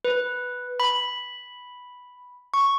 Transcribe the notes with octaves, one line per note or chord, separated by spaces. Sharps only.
B4
B5
C#6